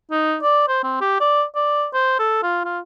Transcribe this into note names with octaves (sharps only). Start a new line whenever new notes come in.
D#4
D5
C5
C4
G4
D5
D5
C5
A4
F4
F4